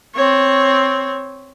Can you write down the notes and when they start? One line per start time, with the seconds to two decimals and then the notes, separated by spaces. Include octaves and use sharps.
0.15 C4 C#5